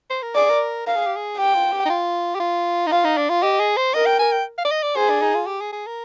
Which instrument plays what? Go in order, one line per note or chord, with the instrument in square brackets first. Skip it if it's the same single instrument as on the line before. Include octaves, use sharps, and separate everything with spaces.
[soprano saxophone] C5
A#4
[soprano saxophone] G#4 [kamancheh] D5
[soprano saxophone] A#4
[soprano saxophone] A#4 [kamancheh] F5
[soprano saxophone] G#4
G4
G#4
[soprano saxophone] G4 [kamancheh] G5
[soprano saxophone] F4
G4
D#4
F4
G4
F4
D#4
[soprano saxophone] F4 [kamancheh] F5
[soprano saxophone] D#4
D4
F4
[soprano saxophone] G4 [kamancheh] D#5
[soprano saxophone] G#4
C5
[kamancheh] A#4 [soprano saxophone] D#5
[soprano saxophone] G5
G#5
G5
F5
D5
D#5
D5
[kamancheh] G#4 [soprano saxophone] C5
[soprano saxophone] D4
D#4
F4
G4
G#4
G#4
A#4